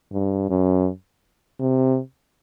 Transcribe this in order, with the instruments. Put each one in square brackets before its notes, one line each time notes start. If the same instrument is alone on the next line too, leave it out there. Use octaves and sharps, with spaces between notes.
[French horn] G2
F#2
C3